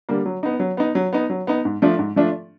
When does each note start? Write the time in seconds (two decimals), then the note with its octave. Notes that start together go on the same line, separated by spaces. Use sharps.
0.09 D3 G3 A#3
0.26 F#3
0.43 B3 D#4
0.60 F#3
0.77 B3 D#4
0.95 F#3
1.13 B3 D#4
1.30 F#3
1.47 B3 D#4
1.65 G#2
1.82 F3 A3 D4 F4
1.99 G#2
2.16 F3 A3 D4 F4